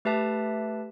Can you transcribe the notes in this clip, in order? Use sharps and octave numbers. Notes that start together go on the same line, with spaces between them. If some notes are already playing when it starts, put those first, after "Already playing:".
A3 G4 B4 E5 A5